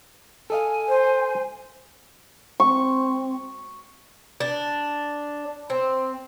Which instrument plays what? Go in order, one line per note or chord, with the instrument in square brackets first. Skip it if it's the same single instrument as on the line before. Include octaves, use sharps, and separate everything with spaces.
[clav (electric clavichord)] A4 D#5 F5 [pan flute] G#5
[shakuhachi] C5
[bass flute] C4 [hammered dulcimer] C#6
[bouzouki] D4
C4